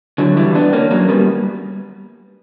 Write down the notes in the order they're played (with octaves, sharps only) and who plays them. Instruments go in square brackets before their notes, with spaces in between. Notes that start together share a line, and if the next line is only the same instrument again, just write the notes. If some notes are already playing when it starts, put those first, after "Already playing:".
[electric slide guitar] D3 F#3
E3 G3
B3 D4
A#3 C#4
F#3 A#3
G3 B3